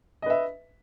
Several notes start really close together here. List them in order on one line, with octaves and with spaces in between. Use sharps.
D#5 B4 E5